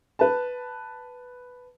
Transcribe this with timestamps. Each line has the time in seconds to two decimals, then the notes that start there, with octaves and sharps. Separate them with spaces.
0.19 B4 A5